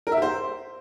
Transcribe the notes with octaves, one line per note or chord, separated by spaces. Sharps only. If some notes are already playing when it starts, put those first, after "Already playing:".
A#4
E5
G4
C5